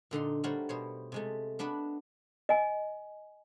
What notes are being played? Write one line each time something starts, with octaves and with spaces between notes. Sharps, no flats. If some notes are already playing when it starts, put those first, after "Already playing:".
A#2 D3 D#4 C6
G3 A3 F#4 A#4 C5 C#5
B2 C5 C#5
C3 G#3 A3
B3 D4 F#4 B4 F#5
D#5 G#5